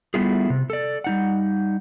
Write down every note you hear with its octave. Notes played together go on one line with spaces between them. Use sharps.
G3 A3 B3 E4 F4 G#4
C3
A4 D5
G3 D#4 F#5